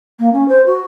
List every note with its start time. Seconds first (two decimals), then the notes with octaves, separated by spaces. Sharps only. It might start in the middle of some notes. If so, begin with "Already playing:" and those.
0.19 A#3
0.33 C#4
0.48 C5
0.66 F#4